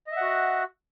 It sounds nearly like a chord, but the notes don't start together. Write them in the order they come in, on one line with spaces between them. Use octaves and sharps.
D#5 E5 F#5 F#4